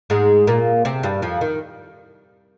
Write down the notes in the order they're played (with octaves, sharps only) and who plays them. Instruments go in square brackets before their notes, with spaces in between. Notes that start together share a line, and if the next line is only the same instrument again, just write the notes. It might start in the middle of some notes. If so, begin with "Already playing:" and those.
[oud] G#2 G#3
A#2 A#3
C3 C4
G2 G3
F2 F3
D#3